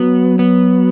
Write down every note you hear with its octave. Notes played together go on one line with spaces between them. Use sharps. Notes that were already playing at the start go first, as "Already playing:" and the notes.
Already playing: F#3 B3
B3